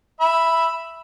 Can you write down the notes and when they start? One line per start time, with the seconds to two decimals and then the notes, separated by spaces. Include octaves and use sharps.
0.20 E5 B5